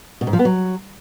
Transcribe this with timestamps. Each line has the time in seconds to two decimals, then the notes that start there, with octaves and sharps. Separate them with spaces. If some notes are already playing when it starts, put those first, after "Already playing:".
0.21 B2
0.27 G#2
0.33 F3
0.39 B3
0.45 F#3